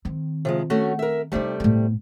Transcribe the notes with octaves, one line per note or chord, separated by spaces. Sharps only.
D#3 C4
C3 F3 G#3
A3 C#4 F#4
A#4 E5
C3 G3 A3 D4 D#4
A2 B3